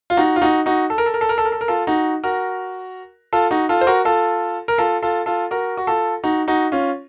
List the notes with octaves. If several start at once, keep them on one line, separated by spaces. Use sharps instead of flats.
F4
D#4 F#4
F4
D#4 F#4
D#4 F#4
A4
A#4
A4
A#4
A4
A#4
A4
A#4
A4
A#4
F4 A4
D#4 F#4
F#4 A#4
F4 A4
D#4 F#4
F4 A4
C5
F#4 A#4
F4 A4
A#4
F4 A4
F4 A4
F4 A4
F#4 A#4
F#4
F4 A4
D#4 F#4
D#4 F#4
C#4 F4